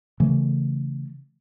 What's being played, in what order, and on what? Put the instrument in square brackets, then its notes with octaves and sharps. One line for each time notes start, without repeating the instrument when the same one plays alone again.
[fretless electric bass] C#3 E3 A3